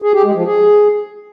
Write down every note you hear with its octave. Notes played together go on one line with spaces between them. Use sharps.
G#4
G4
G#3
F3
G#4